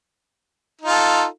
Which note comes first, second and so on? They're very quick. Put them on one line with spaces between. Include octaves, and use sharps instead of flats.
D#4 F4 A4